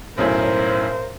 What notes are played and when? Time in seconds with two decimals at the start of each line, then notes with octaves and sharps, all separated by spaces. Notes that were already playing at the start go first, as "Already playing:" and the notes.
0.18 B1 F#2 A2 A#4 C5